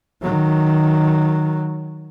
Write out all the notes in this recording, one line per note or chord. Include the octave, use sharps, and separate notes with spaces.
D#3 F#3